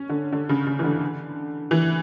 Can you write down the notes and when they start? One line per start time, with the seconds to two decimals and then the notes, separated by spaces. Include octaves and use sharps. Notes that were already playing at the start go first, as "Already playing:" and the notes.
Already playing: C#4
0.09 D3
0.32 D3
0.49 C#3
0.67 C#3
0.79 E3
0.84 D3
1.71 E3